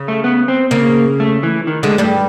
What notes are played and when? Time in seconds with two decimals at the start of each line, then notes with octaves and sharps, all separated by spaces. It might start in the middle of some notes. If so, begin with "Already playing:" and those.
Already playing: C#3
0.08 A3
0.24 B3
0.48 C4
0.71 C#3 A#3
1.20 A3
1.43 E3
1.67 D#3
1.83 D2 D3 G#3
1.98 G2 G3